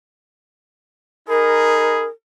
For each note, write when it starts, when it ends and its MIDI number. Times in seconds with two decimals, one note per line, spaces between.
1.28 2.06 63
1.28 2.06 68
1.28 2.05 70
1.28 2.06 83